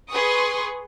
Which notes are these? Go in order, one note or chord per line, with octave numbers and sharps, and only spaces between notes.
G#4 B4 C6 C#6 D#6